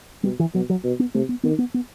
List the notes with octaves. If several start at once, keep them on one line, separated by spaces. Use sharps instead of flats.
B2 G3
E3
B2 F#3
F#3
B2
B3
C3 A3
B3
D#3 B3
B3
B3